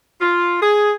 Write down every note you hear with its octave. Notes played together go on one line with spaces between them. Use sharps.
F4
G#4